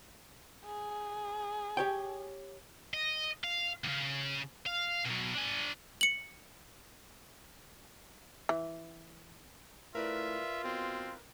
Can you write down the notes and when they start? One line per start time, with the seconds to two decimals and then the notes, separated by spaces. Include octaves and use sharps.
0.65 G#4
1.77 G4 C#5 G5
2.94 D#5
3.44 F5
3.84 D#2 C#3
4.66 F5
5.05 B2 F#3
5.34 D4 G#5
6.01 C#7 F#7
8.49 E3
9.95 A2 F4 A#4 B4 D5 E5
10.64 B2 C4